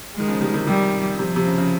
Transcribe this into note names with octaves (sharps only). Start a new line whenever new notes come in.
D#3 G#3
C#3 F3
D#3 G3
C3 D#3
C3 D#3 G3
C3 F3
C3
C#3
C#3